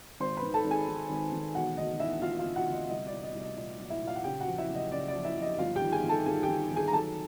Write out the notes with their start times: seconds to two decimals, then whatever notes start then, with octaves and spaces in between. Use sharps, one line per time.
0.20 G#1 C5 C6
0.37 B4 B5
0.43 D#3
0.54 A4 A5
0.65 G#1
0.71 G#4 G#5
0.88 D#3
1.10 G#1
1.32 D#3
1.55 E1 F#4 F#5
1.77 D2 D#5
2.00 D3 E4 E5
2.22 D2 F4 F5
2.39 F4 F5
2.45 D3
2.56 F#4 F#5
2.67 D2
2.73 D#5
2.90 C2 D#5
3.07 D5
3.12 C2
3.23 D#5
3.35 C2
3.40 D#5
3.57 A#2 D#5
3.79 F#3
3.90 E4 E5
4.02 A#2
4.07 F4 F5
4.16 F#5
4.24 C#3 G4 G5
4.41 F#4 F#5
4.47 F3
4.58 E4 E5
4.69 F#1
4.75 D#5
4.91 C#3 D5
5.08 D5
5.14 F3
5.25 E4 E5
5.36 F3
5.42 D#5
5.58 G1 F4 F5
5.76 G4 G5
5.81 D#3
5.92 G#4 G#5
6.03 D#3
6.09 A4 A5
6.26 G1 G#4 G#5
6.43 G4 G5
6.48 D#3
6.71 D#3
6.76 G#4 G#5
6.88 A#5
6.93 F#3 A4 A5